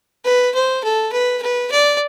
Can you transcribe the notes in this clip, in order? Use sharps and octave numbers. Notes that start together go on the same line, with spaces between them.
B4
C5
A4
B4
B4
D5